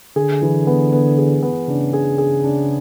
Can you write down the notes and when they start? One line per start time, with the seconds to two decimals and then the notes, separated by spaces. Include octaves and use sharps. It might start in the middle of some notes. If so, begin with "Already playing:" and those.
0.16 D3 G#4
0.42 E3
0.67 B3
0.92 B3
1.18 G#4
1.43 B3
1.68 C#3 D4
1.93 G#4
2.18 G#4
2.44 D4